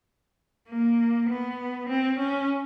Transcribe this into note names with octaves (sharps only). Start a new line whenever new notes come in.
A#3
B3
C4
C#4